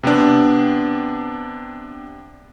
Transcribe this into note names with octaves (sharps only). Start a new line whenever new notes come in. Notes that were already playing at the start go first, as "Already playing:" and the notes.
C3 B3 C4 D4